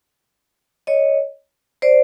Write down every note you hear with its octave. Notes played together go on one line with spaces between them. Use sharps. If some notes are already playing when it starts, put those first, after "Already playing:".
C#5 D#5
C5 D5